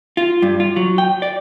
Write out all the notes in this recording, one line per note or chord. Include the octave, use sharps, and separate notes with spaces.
F4
G2
F4
F#3
G5
D5